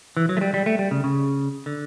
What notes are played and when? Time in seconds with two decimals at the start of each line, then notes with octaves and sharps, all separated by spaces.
0.17 E3
0.29 F#3
0.37 A3
0.41 G3
0.54 G3
0.66 A3
0.79 G3
0.91 C#3
1.04 C#3
1.66 D3